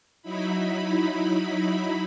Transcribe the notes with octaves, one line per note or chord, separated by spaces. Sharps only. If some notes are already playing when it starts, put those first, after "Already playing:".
F#3 D#4 E4 B5